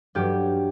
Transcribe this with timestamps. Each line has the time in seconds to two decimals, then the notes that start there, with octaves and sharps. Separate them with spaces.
0.15 G2 F#3 G4